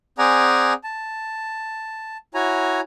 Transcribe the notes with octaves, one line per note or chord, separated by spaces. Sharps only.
C4 G#4 D5 F#5 G#5 A#5
A5
E4 F#4 C#5 G#5 A#5